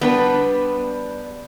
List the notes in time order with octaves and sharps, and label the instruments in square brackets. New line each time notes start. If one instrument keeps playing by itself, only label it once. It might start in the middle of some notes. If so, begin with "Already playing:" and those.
[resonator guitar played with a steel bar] G3 D4 B4 [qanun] B3